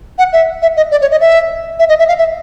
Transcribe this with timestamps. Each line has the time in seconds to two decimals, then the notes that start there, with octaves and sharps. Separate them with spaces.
0.18 F#5
0.33 E5
0.62 E5
0.77 D#5
0.91 D5
1.01 C#5
1.11 D#5
1.21 E5
1.79 E5
1.89 D#5
1.99 E5
2.08 F5
2.18 E5